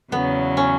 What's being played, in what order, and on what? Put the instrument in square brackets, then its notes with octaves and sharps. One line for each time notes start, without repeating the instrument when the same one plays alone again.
[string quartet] E2 C#3 F#3 [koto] B3
[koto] C#4